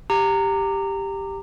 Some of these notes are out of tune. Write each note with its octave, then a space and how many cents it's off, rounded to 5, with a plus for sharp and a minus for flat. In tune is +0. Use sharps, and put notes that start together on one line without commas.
G4 +5 A#5 -20